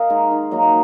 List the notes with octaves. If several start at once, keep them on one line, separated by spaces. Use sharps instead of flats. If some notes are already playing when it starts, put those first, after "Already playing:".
Already playing: A#4 D#5 F5
G#3 D#4
D#3
F#3 A#3 D#4
D#5